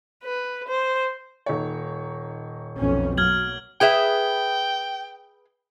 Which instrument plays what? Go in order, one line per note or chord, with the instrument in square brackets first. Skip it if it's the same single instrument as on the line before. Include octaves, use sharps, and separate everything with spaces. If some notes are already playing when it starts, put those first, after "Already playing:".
[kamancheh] B4
C5
[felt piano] D#1 D#4 C#5
[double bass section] B1 F2 C#4
[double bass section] F#3 A#3 [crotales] F6 G#6 F#7
[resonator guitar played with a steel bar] G#4 B4 E5 [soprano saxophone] G5